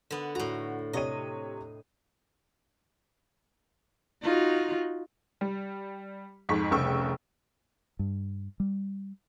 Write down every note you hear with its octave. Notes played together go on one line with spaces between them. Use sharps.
D3 B3
A2 F#4 A#5
C3 C#5 D#5 D#7
D#4 F4 F#4
G3
F2 G#2 C#6 B6
F1 C2 C#3 G5 C#6 E6
G2
G3